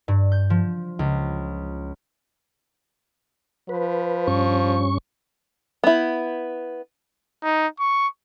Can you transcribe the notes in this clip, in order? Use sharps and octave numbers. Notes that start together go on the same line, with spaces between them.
G2
G6
F3
C#2
F3 B4
G2 C#4 C#6
B3 E4
D#4
C#6